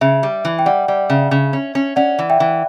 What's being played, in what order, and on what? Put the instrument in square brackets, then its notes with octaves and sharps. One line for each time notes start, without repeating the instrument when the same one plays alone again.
[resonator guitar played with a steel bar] C#3 [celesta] E5
[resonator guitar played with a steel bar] G3
E3
[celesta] G5
[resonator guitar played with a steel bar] G3 [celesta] D5 F#5
[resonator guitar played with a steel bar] G3 [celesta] D5
[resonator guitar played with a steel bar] C#3 [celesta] E5
[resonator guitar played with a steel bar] C#3
C#4
C#4
[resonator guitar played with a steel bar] C#4 [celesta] D5 F#5
[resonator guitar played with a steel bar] E3
[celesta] E5 G5
[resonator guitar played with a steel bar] E3